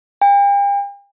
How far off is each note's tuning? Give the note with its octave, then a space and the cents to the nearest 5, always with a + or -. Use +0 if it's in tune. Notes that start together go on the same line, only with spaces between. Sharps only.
G5 +40